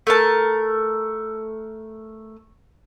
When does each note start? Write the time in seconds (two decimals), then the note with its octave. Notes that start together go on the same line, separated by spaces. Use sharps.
0.07 A3 A#4 A5